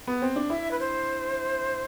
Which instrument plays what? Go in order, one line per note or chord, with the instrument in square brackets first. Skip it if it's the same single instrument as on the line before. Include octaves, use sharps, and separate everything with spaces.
[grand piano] B3
C4
D4
[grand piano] E4 [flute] E5
[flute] B4
C5